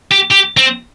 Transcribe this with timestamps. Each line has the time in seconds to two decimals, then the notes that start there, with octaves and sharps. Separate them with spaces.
0.11 G4
0.31 G4
0.57 C4